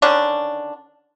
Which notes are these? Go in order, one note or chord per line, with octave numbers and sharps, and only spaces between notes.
D3 D#3 C#4 D4